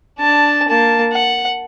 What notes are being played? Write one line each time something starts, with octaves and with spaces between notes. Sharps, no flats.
D4 A5
A#3 A5
F#5